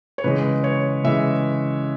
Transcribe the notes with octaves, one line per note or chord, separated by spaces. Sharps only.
C#5
C#3 E3 G#3 B4
C#5
C#3 E3 G#3 E5